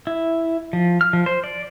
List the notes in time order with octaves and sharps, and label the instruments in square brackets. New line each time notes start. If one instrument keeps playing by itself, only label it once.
[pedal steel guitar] E4
F3
F6
F3
C5
D5